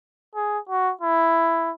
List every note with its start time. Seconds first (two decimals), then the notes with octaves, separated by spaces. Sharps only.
0.35 G#4
0.69 F#4
1.01 E4